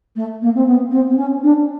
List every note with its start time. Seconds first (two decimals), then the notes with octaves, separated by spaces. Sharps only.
0.16 A3
0.42 A#3
0.55 C4
0.66 B3
0.91 C4
1.10 C4
1.17 C#4
1.43 D4